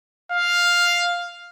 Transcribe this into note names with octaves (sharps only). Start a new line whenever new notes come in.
F5